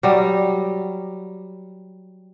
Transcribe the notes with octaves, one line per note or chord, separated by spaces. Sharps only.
F#3 G3